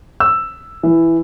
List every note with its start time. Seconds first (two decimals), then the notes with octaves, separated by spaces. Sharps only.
0.20 E6
0.83 E3